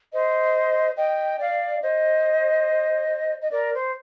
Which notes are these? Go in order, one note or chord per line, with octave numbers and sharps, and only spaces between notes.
C5 D#5
D#5 G5
D5 F5
C5 D#5
D#5
A#4 D5
C5